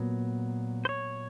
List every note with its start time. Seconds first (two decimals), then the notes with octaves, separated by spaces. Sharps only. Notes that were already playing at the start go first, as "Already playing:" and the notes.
Already playing: A#2 F#3 B3
0.85 C5
0.89 C#5